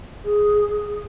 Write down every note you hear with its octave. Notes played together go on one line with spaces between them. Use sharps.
G#4